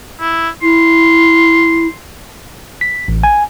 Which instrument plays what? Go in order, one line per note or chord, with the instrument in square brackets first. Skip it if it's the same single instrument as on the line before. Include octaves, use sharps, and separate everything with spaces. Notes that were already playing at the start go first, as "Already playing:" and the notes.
[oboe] E4
[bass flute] E4 [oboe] C6
[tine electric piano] B6
A1
G#5